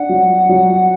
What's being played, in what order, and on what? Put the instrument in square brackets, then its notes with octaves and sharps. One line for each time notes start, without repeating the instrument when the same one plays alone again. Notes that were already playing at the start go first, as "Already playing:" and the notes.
Already playing: [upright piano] D4 [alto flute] F#5
[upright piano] F#3
F#3